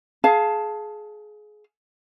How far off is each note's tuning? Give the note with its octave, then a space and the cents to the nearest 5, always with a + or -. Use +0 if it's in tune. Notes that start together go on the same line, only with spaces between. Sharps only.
G#4 +25 F5 +0 A5 +0